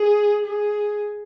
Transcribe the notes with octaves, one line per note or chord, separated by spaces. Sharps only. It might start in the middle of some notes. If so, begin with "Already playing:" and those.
Already playing: G#4
G#4